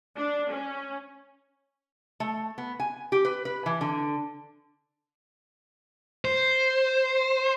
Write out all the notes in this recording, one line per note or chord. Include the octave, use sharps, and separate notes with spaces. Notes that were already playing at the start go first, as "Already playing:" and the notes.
D4
C#4
A3
B3
G#5
G4
B4
B4
E3
D3
C5